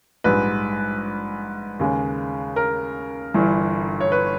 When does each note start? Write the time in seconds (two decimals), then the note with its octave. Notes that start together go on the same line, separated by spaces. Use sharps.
0.24 A#1 G#2 G3 B4
1.79 D#2 C#3 G#3
2.56 A#4
3.34 G1 G2 E3
4.01 C#5
4.12 B4